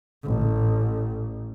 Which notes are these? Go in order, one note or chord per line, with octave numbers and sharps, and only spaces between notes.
A1